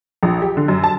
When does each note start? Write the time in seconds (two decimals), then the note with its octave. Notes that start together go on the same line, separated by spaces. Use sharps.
0.23 A#1
0.42 G4
0.57 D3
0.68 F#2
0.84 A5